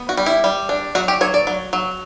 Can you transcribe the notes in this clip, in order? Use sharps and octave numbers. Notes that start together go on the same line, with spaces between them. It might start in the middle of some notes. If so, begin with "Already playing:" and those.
Already playing: B3
F#4
G3
E4
G3
D4
F#3 F#4
G4
F#3 C#5
D5
F#3
F#3